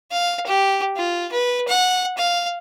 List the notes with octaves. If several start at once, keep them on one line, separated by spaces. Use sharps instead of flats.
F5
G4
F4
B4
F#5
F5